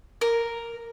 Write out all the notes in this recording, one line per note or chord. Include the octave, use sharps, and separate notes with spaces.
A#4